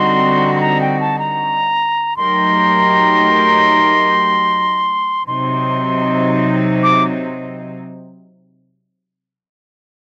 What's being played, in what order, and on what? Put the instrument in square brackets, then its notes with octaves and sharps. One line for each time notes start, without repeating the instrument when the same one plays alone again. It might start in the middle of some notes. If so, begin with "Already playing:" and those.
Already playing: [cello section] D3 G3 C4 D#4 F#4 [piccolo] C6
[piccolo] C6
A#5
G5
A5
A#5
[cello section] F#3 A3 D#4 G4 A#4 [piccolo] C6
[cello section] C3 F#3 C4 D#4 [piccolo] C6
[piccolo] D6